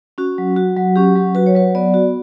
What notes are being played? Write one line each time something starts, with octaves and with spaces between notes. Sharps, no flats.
C#4 F#4
F#3
F#4
F#3
C#4 G4
F#3
F#4 B4
C#5
F#3 B4
B3 D5
F#4